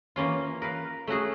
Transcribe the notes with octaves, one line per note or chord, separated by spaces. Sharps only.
E3 A#3 C#4 F4
A#4 B4 F5
A3 C#4 F#4 G#4